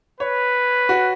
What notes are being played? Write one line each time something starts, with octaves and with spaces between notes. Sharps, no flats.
B4 C#5
F#4